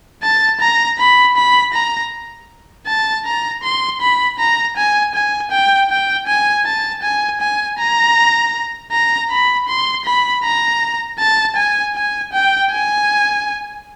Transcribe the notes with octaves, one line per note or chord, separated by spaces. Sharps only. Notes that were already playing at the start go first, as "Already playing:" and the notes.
A5
A#5
B5
B5
A#5
A5
A#5
C6
B5
A#5
G#5
G#5
G5
G5
G#5
A5
G#5
G#5
A#5
A#5
B5
C6
B5
A#5
A5
G#5
G#5
G5
G#5